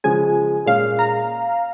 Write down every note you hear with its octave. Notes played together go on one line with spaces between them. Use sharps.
C#3 F3 G#3 C#4 G#5
A#2 G#3 C#4 F5
A#5